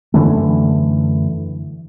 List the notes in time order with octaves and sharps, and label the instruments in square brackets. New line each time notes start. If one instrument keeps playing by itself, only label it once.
[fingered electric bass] F#2 D3 E3 A3